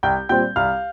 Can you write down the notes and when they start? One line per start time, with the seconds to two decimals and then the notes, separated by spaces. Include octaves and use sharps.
0.03 C2 G5 G6
0.29 A#2 G3 C4 G5 G6
0.56 C2 F5 F6